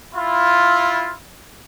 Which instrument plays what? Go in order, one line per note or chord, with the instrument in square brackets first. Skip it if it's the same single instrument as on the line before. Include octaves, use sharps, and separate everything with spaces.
[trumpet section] E4 F4